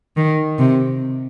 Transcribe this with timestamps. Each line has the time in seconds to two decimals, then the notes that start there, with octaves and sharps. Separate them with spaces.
0.16 D#3
0.59 C3